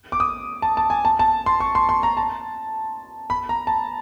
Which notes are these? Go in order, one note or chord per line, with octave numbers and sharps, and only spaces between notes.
D6
D#6
A5
A5
G#5
A5
A5
C6
C#6
C6
C6
A#5
A5
B5
A#5
A5